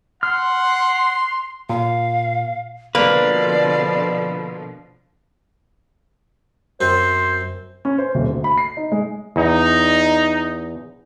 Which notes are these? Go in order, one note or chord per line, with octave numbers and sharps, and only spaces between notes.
F#5 C6 F6
A#2 F5
B2 D3 F3 A#3 B4 D5
F#2 C4 C5
C#4
C5
D#1
D2
B5
C7
D#4
G#3
E2 D#4